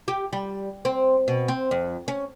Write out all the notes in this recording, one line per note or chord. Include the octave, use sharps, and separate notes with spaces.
G4
G3
C4
B2
C4
F2
C#4